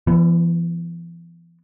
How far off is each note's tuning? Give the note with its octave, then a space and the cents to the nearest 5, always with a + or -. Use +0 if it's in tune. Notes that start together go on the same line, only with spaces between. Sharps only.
E3 +45 B3 +0